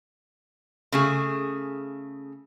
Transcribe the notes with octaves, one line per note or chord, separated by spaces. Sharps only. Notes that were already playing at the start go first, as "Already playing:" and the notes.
C#3 A3 G#4